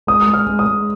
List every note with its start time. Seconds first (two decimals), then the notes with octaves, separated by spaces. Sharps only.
0.07 G#3 D#6
0.27 G#3
0.34 F6
0.47 G#3
0.59 D#6
0.66 G#3